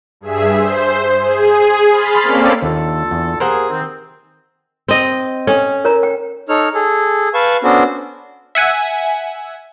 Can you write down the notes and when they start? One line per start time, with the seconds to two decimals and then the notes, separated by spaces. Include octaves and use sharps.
0.21 G2 G#4 E5
0.55 C5
1.21 G#4
1.90 B5 C6 F6 A6
2.23 A#3 C4 C#4 A4 D5
2.62 D#2 D3 F4 A4
3.11 E2
3.40 A#3 G4 G#4 A#4 C5 F#5
3.70 D#3 C4
4.88 C4 D#5
5.47 C#4 A4 G5
5.85 A#4 C#5 A#5
6.03 G5
6.49 D#4 A4 C#5 F6
6.74 G#4 A4
7.34 B4 F5 A5 C#6
7.64 B3 C#4 D4 F#4 A4 C5
8.55 E5 F#5 G#5